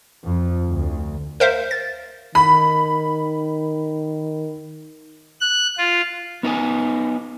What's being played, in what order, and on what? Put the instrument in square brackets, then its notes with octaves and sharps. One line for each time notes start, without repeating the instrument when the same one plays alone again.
[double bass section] F2
D2
[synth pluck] A#4 C5 E5 F5
A6
[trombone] D#3 [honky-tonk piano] B5
[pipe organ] F#6
F4
[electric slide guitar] B3 D#4 E4 A#4 D#5 G#5